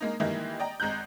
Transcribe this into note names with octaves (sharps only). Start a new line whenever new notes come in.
G#3 A#3 D#4
D#3 E3 G3 G#3 A#3 E4
D5 D#5 G5 A#5
G#1 G#3 A#5 F#6 G6